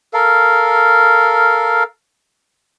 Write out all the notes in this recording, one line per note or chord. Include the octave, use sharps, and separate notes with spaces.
A4 A#4 F5